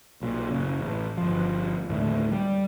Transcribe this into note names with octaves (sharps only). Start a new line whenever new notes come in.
B1 A#2
F#1 C#3
A1
G1 F3
D#2 A2 D3 A3
G3